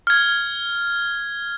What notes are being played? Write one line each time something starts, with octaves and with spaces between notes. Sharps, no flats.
F6 G#6